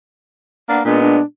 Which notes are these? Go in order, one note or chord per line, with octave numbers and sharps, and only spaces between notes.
A#3 B3 D4
A#2 G#3 B3 D4
D4